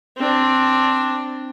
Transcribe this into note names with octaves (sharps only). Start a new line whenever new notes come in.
C4 D4